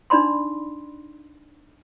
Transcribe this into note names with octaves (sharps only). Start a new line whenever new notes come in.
D4 D#4 D5 B5 C6